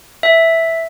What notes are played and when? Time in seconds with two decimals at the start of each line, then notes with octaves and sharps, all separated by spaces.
0.23 E5